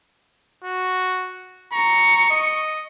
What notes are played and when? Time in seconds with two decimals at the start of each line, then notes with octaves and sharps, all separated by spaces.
0.64 F#4
1.73 A#5 C#6 C#7
2.30 D#5